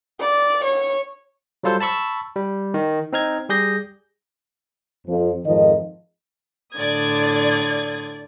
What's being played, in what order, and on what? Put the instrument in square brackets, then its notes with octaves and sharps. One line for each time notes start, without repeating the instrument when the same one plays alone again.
[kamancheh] D5
C#5
[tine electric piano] F#3 G3 F4 A4 C5
A5 B5 C#6 E6
G3
D#3
C4 D#4 F6 G#6
G3 G4 G#4 G6 A#6
[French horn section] F2 F3
F2 G#2 D#3 F3 D#5
[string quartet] A2 D3 D#6 [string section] D5 G#6